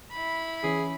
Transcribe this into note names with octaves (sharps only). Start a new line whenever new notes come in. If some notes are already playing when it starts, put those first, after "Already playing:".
E4 B5
E3 C#4 G#4